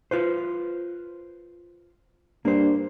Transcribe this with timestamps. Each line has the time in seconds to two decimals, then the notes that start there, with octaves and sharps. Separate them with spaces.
0.11 F4 B4 C5
2.45 G2 A#3 C5